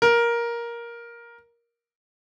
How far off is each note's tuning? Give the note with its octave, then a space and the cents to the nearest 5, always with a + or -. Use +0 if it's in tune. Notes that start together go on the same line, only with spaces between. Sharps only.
A#4 +10